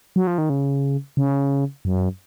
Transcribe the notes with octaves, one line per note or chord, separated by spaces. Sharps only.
F#3
F3
D#3
C#3
C#3
F#2